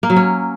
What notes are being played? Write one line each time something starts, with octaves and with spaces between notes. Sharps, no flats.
A#3
F#3
C#4